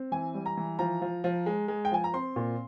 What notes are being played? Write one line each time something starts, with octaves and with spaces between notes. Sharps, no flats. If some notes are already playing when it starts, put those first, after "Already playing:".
Already playing: C4
E3 G#5
G3
A#5
E3
F3 A#5
F3
F3
G#3
G#3
G5
F3 G#5
A#5
C4 C6
A#2